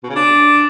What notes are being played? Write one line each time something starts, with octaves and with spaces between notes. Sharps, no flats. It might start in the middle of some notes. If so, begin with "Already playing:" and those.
B2
C#3
D4